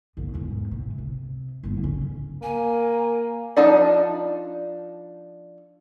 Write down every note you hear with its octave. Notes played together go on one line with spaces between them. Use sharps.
C2 G2
E2 G#2
C3
C3
G1 E4
C#3 C#4
A#3 G#5
F3 D4 D#4 D5